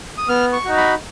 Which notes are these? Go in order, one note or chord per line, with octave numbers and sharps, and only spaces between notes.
D#6
B3 F6
C#6
D#4 F#4
B5